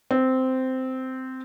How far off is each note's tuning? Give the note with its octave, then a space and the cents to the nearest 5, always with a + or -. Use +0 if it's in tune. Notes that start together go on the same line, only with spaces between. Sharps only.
C4 -10